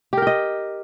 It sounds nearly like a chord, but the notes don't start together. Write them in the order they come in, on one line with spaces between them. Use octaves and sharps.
G4 A#4 G5 D#5